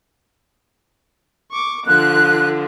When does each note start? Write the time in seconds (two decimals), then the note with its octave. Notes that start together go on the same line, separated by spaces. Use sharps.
1.51 C#6 D6
1.86 D3 F3 F#6